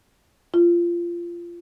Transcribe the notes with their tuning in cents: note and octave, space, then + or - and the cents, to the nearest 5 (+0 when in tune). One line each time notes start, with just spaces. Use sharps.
F4 -20